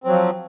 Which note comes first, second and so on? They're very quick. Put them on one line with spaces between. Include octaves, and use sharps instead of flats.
C4 F#3 F3